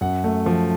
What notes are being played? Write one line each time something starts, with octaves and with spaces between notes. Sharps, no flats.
F#2 F#5
A3
F3